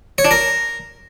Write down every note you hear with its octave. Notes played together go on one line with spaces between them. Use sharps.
C#5
D4
A#4